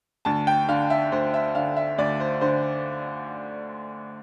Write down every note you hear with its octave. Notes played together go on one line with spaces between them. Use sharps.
D2 A5
G5
D3 F5
E5
D2 C5
E5
D3 F5
E5
D2 D5
C5
D3 C5